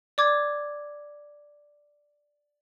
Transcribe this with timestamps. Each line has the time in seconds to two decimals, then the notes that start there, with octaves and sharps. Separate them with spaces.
0.18 D5 D6 G#6